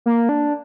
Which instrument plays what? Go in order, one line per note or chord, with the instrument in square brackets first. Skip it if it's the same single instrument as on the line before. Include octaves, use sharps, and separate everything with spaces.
[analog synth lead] A#3
D4